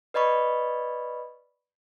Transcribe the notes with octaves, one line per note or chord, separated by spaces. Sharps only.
B4 D5 D#5 B5 C#6